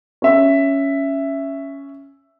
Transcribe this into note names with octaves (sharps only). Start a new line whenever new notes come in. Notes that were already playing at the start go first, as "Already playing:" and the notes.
C#4 E5